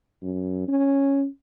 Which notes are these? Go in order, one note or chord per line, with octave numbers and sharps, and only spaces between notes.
F#2
C#4